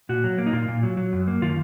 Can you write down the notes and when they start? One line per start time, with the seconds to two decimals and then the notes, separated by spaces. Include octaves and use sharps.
0.09 A#2 F#4
0.24 F#3
0.38 A#3
0.46 D#4
0.53 A#2 F4
0.68 A#2
0.83 F#3
0.97 F#3
1.13 F#2
1.28 A#3
1.42 D#3 F4